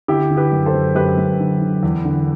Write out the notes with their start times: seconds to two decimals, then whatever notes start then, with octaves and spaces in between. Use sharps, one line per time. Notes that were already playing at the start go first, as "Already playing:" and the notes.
0.08 D3 E4 G4
0.30 D3
0.37 G4 B4
0.52 F#2
0.66 A4 C5
0.73 F#2
0.95 F#2 G4 B4
1.17 F#2
1.39 D3
1.61 D3
1.83 E2
2.05 D3